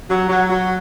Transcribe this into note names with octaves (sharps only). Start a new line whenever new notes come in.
F#3
F#3
F#3